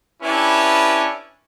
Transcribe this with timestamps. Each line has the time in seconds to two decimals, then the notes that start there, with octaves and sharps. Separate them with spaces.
0.22 C#4 D4 E4 G4 B4